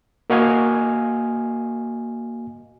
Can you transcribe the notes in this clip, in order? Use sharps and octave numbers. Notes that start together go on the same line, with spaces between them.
A#3 F#4 D#5 F5 G#5